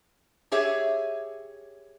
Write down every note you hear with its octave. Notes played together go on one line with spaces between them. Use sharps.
G4 G#4 C#5 E5